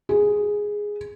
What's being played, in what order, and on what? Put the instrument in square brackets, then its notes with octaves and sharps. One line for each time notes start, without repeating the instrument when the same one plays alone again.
[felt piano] G#4